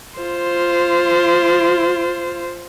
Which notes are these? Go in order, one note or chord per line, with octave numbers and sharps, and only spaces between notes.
F4 C5